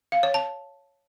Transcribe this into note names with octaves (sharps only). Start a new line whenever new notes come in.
F5
C#5
A5